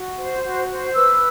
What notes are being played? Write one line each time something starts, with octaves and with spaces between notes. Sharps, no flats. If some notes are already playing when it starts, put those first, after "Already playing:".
Already playing: F#4
C5
F#4
C5
B4 E6